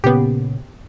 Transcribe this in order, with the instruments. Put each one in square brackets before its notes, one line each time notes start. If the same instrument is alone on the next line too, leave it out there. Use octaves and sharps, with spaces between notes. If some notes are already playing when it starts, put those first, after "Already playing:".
[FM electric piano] A#2 C#3 [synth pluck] B3 G4